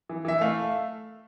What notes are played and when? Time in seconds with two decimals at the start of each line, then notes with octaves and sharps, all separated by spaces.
0.09 E3
0.25 E3 E5
0.41 A3 F5